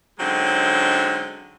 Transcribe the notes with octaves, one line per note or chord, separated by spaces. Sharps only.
D3 F#3 G#3 C4 C#4 D#4